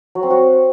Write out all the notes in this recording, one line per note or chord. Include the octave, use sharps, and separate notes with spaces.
F#3
C4
F#4